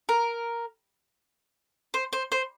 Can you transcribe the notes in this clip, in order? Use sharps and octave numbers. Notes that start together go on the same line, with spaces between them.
A#4
C5
C5
C5